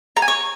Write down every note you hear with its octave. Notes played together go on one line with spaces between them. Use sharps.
A#5
G#5
C#5